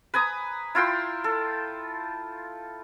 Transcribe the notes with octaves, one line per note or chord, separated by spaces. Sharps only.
B4 G#5 A#5 D#6
E4 F4 G5 C6
A4